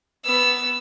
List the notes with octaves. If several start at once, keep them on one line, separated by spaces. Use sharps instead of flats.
B3 E6